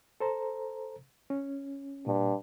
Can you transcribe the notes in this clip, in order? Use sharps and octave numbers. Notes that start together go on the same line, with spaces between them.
A4 C5 A#5
C#4
G2 A#2